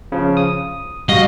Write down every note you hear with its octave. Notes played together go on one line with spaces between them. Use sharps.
C#3 F3
D#6
G3 F#4 D#5 F5